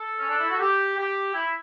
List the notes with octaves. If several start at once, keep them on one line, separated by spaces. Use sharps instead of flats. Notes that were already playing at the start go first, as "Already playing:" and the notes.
Already playing: A4
C#4
D4
E4
F#4
G4
G4
E4